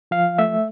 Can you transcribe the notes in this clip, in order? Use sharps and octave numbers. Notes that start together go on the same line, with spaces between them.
F3 F5
A3 E5